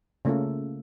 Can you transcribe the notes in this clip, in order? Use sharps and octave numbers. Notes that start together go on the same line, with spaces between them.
C#3 A3 A#3 F4 A4